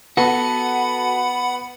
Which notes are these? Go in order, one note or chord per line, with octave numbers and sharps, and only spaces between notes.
B3 F#4 A4 F#5 B5